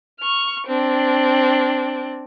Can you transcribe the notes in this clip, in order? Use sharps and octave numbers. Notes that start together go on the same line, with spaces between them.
C#6 F6
C4 D4